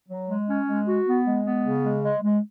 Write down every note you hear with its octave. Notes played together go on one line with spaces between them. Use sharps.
F#3
G#3
C#4
G#3
F#4
B3
G#3
B3
C#3
G#3
G#3
G#3